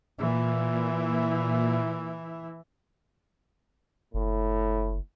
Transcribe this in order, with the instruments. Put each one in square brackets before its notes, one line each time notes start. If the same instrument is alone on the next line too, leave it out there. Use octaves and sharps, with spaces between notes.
[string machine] A#2 [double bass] E3 E4
[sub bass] F#1 [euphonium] A2